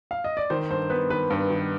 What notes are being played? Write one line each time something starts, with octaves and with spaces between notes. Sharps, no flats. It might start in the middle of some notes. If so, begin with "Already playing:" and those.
F5
D#5
D5
D#3 C5
G2 C5
B3 B4
D#3 B4
G2 B4
D#3